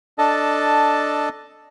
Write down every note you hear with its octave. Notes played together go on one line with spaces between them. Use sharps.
D4 A4 D#5 A5